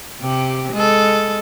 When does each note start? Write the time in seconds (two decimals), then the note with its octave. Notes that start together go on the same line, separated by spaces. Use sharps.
0.21 C3 G4
0.72 G#3 A4